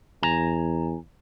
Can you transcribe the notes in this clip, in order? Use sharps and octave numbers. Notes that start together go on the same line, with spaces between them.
E2 G#5 A#5